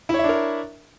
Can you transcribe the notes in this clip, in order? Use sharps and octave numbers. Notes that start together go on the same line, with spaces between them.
D4 E4 A#4 C#5 E5